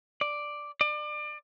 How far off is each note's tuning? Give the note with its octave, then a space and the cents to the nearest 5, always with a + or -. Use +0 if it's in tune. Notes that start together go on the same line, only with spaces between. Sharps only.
D5 +5
D5 +30